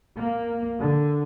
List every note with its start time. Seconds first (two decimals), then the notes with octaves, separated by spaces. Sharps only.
0.15 A#3
0.79 D3